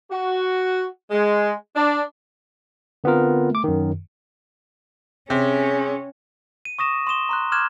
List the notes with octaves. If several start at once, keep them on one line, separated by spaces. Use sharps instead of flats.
F#4
G#3
D4
D3 B3 C4 F4 A#4
A3 D6
F#2 D#3
C3 C#4 G#4
D#7
C#6 D#6 A#6 E7
C6 D#6 E7 G7
A#5 C6 F#6
C6 D6 F6 F#6 G#6 E7